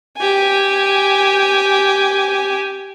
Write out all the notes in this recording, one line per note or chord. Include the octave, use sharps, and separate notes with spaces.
G4 G#5